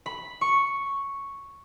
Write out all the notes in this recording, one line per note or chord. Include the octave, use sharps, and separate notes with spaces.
B5
C#6